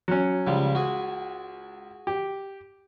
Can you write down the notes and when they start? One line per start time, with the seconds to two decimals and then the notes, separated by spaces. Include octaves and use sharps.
0.08 F#3 C#4
0.47 C#2 C#3 F3 G3
0.75 F#4 G#4
2.07 G4